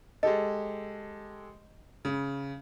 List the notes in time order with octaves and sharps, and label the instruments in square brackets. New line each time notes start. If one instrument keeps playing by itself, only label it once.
[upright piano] G#3 G4 A4 [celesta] D#5
[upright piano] C#3